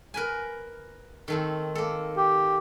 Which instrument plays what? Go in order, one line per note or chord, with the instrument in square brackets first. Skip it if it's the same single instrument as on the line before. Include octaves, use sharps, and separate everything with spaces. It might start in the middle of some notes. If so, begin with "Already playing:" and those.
[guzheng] A#4 B4 G#5
D#3 A3 C4
A#3 A4
[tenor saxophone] G4